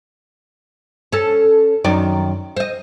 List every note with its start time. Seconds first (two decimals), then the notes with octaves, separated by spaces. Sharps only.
1.13 C#4 A4
1.84 F#2 D#3 D5
2.57 C5 D#5